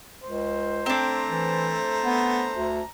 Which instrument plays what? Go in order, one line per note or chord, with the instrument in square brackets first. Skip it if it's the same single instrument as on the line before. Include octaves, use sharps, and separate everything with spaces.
[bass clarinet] C#2 [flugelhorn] C5
[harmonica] A3 A#5 [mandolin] C4 D4
[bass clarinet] E3
B3
D2